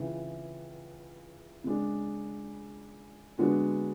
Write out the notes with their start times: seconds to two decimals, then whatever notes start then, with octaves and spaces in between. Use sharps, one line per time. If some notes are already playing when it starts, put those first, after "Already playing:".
Already playing: C#2 C#3 E3
1.64 C#3 G#3 D4
3.38 D3 G#3 B3 D4 F#4